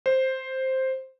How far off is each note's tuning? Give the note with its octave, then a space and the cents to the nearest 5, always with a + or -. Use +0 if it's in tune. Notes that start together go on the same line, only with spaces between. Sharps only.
C5 +5